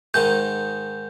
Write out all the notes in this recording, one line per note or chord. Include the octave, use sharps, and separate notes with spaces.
G#2 D#3 G#3 G6